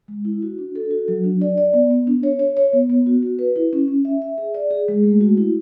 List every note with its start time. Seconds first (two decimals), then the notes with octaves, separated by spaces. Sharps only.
0.08 G#3
0.25 E4
0.42 F#4
0.58 D4
0.75 A4
0.91 F#4
1.08 F#3
1.24 D4
1.41 D5
1.58 D5
1.74 B3
1.90 B3
2.07 D4
2.23 C#5
2.39 C#5
2.57 C#5
2.73 B3
2.89 B3
3.06 F#4
3.23 F#4
3.39 B4
3.56 E4
3.73 C#4
3.88 C#4
4.05 E5
4.22 E5
4.38 G#4
4.54 D5
4.71 G#4
4.88 G#3
5.04 A3
5.21 F#4
5.37 E4